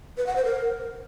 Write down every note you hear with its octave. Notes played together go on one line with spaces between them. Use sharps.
B4
F#5
C5
A#4